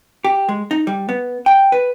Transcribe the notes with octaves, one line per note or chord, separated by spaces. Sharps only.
G4
G#3
D#4
G3
B3
G5
B4